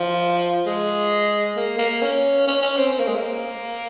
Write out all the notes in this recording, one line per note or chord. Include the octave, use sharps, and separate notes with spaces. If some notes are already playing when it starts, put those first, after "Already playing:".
Already playing: F3
G#3
A#3
A#3
C#4
C#4
C#4
C4
C4
A#3
G#3
A#3